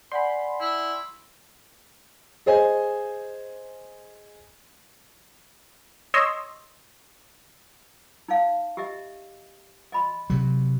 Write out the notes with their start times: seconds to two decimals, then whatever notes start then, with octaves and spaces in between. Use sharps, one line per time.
0.12 D5 F#5 G#5 B5 C6
0.60 E4
2.46 G#4 C5 D#5 G#5
6.14 C#5 D#5 C6 E6
8.28 D#4 D5 F5
8.77 G4 D#5 E5
9.92 D#5 B5 C6
10.30 C3 F#3